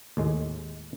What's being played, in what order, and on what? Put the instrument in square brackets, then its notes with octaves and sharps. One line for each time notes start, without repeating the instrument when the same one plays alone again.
[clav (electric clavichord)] D#2 A2 G#3